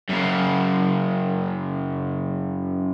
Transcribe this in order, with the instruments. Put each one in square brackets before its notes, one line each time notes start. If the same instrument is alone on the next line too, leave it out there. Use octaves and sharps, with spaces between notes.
[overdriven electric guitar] F#2 C#3